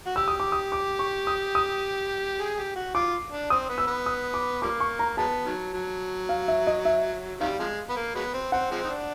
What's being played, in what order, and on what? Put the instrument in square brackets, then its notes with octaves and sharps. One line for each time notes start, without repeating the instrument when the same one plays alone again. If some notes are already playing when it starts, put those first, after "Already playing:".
[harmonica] F#4
[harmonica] G4 [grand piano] E6
[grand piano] D#6
D6
D#6
D6
C#6
D#6
D#6
[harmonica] G#4
G4
F#4
[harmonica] F4 [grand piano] D6
[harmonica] D4
[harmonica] C4 [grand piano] D#6
[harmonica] B3
[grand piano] E6
[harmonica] B3
[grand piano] D#6
D6
[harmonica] F3 G3 A#3 [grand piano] D6
[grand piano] C#6
A#5
[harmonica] F#3 G#3 B3 [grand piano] A5
[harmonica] D#3 F#3
F#3
[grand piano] F5
E5
D#5
E5
[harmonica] C3 D#3 G3 [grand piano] F5
[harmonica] C3 F3 G#3
B3
A#3
F#3 G#3 B3
C4
[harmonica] C4 [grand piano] F#5
[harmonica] F3 G#3 C4
D#4
D4